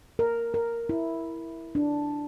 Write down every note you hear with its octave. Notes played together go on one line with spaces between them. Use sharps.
A#4
A#4
E4
D4